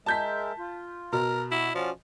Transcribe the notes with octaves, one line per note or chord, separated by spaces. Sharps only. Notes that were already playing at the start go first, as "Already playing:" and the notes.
G#3 A#4 E5 A5 G6 B6
F4
B2 A#4
E4 F#4
F3 C#4 F#4 D5